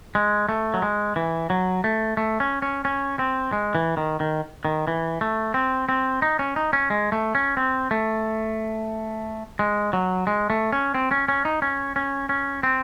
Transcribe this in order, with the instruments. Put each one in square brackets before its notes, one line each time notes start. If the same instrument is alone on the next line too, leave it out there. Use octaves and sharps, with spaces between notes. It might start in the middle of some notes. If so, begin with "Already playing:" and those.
[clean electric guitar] G#3
A3
F#3
G#3
E3
F#3
A3
A3
C#4
C#4
C#4
C4
G#3
E3
D#3
D#3
D#3
E3
A3
C4
C4
D#4
C#4
D#4
C#4
G#3
A3
C#4
C4
A3
G#3
F#3
G#3
A3
C#4
C4
C#4
C#4
D#4
C#4
C#4
C#4
C4